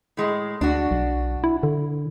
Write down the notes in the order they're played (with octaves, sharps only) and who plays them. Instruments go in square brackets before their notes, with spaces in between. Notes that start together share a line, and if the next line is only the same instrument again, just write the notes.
[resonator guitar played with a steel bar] A2 G#3
[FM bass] D2 [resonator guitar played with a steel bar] D4 F#4
[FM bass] B1
E4
D3